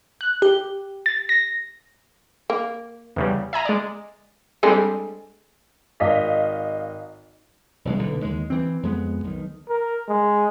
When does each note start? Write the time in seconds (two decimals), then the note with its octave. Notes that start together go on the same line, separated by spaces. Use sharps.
0.21 F#6
0.42 G4
1.06 A6
1.29 A#6
2.50 A#3
3.16 E2 C#3 G3
3.53 E5 G#5 A#5
3.65 G#3 D5
4.63 G3 G#3 C4 D4 G#4 A4
6.00 G#1 D#5 F5 B6
7.85 E1 C2 G#3
7.99 B1 D3
8.22 D#2 G#3
8.50 E3 C4
8.83 F2 G#3 B3
9.24 B1 D#3
9.69 A#4
10.08 G#3